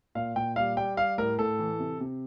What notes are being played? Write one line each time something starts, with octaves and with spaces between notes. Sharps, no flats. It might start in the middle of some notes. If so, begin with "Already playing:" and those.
A#2 F5
A#2 G5
G3 F5
G3 G5
G3 F5
A2 A#4
A2 A4
E3
C3
C3